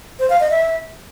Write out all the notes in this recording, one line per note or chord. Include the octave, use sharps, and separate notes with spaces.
C5
F5
D#5
E5